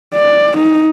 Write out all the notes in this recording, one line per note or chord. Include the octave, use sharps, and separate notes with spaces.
D5
D#4